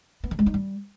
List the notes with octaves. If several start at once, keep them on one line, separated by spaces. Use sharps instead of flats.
B3
F3
G#3
D#4
G3